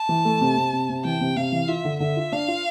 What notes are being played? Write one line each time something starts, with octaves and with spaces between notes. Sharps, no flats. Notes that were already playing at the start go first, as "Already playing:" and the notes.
Already playing: A5
E3
A3
C3
C3
C3
C3
E3 G5
C3
C3 F5
E3
F4 E5
D3
D3 E5
F4
D4 F5
F4